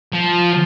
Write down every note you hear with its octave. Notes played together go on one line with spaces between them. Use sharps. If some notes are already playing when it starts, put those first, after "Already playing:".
F3